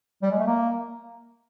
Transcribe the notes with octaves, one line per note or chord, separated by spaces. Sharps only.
G3
G#3
A3
A#3